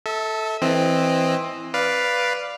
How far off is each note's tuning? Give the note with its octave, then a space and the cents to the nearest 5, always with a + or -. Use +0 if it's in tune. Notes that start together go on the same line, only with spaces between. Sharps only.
A4 +0 E5 -30
E3 +0 C4 +10 D#5 +0
B4 +0 D5 +0 F5 +0